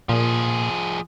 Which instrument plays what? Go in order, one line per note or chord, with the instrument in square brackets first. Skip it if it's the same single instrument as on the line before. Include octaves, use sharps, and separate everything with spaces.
[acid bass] A#2 [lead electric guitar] F3 G#4